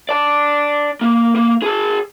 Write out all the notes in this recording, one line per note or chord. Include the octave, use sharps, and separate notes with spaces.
D5 A5
A#3
A#3
G#4 A5